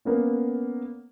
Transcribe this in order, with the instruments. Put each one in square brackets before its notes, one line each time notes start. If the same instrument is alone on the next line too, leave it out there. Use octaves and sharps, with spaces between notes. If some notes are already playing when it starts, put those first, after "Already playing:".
[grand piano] A#3 B3 C#4